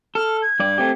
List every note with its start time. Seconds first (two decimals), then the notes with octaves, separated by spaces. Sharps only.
0.15 A4 F6
0.42 G#6
0.60 G2 D5
0.78 A3 C4 G4